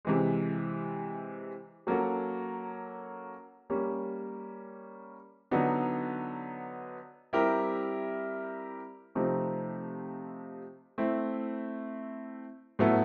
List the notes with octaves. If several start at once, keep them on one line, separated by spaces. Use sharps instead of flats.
C3 E3 G#3
F#3 A#3 C#4 F#4 A4
G3 A#3 C#4
D3 F#3 B3 D#4
G3 C4 E4 G4 A#4
C3 F3 A3 C4 D#4
A3 C4 E4
A2 F#3 B3 E4 A4